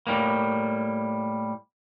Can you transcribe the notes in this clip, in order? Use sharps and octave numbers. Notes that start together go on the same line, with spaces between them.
A2 G3 A#3